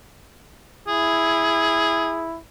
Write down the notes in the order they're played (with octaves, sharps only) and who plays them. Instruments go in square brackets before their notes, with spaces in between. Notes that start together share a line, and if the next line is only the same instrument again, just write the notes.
[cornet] E4 [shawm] G#4